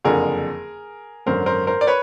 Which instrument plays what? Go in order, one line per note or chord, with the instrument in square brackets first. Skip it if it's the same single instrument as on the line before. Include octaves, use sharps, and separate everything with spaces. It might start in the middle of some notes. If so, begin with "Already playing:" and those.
[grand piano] F#1 F2 D3 G#4 A#4
G#1 F#2 D3 A#4 C5
A#4 C5
A#4 C5
D5
B4 C#5